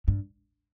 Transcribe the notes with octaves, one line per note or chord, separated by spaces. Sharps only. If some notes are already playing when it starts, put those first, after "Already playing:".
G2